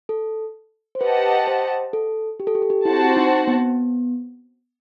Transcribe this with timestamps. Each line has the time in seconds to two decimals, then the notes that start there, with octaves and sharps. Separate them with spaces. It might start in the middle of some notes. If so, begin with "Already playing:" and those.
0.09 A4
0.95 C5
1.01 G4 B4 D#5 F#5 A5
1.47 C5
1.93 A4
2.40 G4
2.47 A4
2.55 G4
2.62 A4
2.70 G4
2.85 C4 E4 F#4 C5 F#5 A5
3.17 D#4
3.47 B3